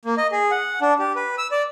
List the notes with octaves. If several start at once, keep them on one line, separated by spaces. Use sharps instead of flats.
A#3
D#5
G#4
F#5
D4
G4
B4
E6
D5